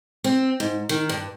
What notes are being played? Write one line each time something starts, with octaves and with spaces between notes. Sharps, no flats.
C4
G#2
D#3
G2